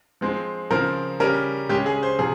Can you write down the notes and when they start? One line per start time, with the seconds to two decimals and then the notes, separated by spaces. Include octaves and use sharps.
0.21 F3 G#3 C4
0.70 C#3 F3 C4 A#4
1.20 C#3 G3 C#4 A#4
1.69 C#3 G#3 C#4 G4
1.86 G#4
2.03 C5
2.19 C3 F3 G#4